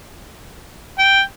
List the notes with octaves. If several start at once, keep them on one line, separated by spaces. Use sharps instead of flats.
G5